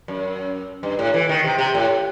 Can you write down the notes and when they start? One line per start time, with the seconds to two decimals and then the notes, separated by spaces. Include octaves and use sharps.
0.08 F#2
0.83 G2
0.99 A2
1.14 E3
1.29 D#3
1.45 C3
1.59 C3
1.75 A2